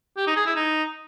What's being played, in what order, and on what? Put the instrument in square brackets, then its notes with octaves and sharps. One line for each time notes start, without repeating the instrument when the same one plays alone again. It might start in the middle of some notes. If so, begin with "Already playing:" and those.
[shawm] G4
D#4
G#4
E4
D#4